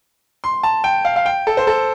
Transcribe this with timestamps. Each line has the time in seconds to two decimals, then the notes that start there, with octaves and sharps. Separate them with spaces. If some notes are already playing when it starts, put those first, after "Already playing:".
0.44 C6
0.63 A5
0.84 G5
1.05 F5
1.16 F5
1.26 G5
1.47 A4
1.57 C5
1.67 A4